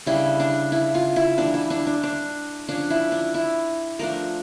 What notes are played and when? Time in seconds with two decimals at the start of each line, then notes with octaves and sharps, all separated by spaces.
0.06 C#3 G3 D4 E4
0.40 D4
0.72 E4
0.95 F4
1.16 E4
1.38 E3 G3 A#3 D4
1.54 E4
1.70 D4
1.87 D4
2.03 D4
2.69 F3 C#4 D4
2.90 E4
3.12 D4
3.34 E4
3.99 F3 A3 D4 A#4